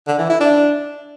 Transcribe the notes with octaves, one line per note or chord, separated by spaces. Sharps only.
D3
E3
E4
D4